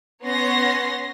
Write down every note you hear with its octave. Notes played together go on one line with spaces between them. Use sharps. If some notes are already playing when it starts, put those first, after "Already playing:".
B3 C#4 C#5 C6 A#6